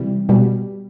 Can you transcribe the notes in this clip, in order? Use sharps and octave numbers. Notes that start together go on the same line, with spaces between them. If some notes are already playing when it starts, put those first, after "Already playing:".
Already playing: C3 E3 G3
B2 G3